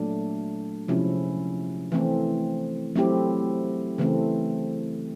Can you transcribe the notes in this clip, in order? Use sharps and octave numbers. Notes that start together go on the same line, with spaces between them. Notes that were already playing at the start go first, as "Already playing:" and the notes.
Already playing: A#2 F#3 A3 D4
C3 F3 G#3 C#4 E4
E3 A3 C4
F#3 A3 C4 E4 G4
C#3 E3 A3 C4